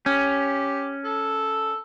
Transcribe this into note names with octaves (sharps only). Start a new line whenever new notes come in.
C#4 G4
A4